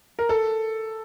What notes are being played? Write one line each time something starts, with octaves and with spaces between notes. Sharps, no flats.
A#4
A4